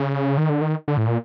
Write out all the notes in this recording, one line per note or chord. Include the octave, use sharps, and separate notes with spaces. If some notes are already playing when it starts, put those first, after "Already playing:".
Already playing: C#3
D#3
D3
D#3
D3
A2
A#2